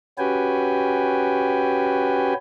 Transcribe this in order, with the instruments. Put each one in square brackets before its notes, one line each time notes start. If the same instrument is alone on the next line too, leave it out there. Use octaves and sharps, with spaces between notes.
[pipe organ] C#4 F#4 G4 B4 G5 G#5